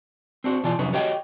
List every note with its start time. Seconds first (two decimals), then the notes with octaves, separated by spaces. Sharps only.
0.44 C4 D4 F#4 C5
0.63 B2 E3 F4 D5 G#5 A5
0.78 F2 C3 F#3 C#4 D#4 B4
0.92 F#4 G4 C#5 D#5 G5